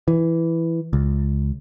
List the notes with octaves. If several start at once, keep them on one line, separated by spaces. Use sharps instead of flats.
E3
C#2